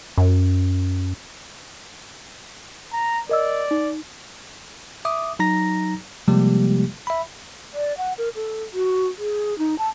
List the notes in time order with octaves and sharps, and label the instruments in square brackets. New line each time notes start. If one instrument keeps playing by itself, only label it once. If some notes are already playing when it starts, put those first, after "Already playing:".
[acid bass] F#2
[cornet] A#5
[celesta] A#4 D#5 E6 [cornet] D5
[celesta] D#4
[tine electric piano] E5 D6 D#6
F#3 D#4 A#5 A#6
C3 F3 G3 G#3 A#3 G4
E5 B5
[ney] D5
F#5
A#4
A4
F#4
G#4
D#4
A5